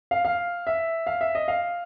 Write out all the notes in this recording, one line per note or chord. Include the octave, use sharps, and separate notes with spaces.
F5
F5
E5
F5
E5
D#5
F5